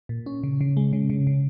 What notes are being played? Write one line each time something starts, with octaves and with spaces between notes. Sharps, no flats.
A#2
C#4
C#3
C#3
G#3
C#3
C#3
C#3